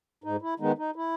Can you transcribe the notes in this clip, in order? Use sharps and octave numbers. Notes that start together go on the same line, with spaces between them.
G#2 D#4
E4
D#3 G#3 B3 D#4
D#4
E4